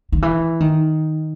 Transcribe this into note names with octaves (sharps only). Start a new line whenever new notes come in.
D#3
E3
D#3